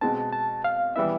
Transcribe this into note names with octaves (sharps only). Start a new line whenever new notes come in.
B2 G#3 C4 A5
A5
F5
E3 G3 B3 E4 E5